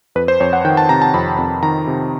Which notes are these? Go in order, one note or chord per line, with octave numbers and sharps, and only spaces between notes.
F2 B4
C5
F2 C#5
F#5
D#3 G5
A5
C3 A#5
A5
F2 B5
F2
D#3 A#5
C3